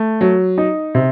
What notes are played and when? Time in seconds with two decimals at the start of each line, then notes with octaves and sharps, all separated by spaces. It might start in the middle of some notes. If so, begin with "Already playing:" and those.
Already playing: A3
0.21 F#3
0.58 D#4
0.95 C3